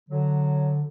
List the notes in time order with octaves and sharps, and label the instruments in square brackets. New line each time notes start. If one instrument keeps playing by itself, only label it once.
[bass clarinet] D3 [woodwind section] F#3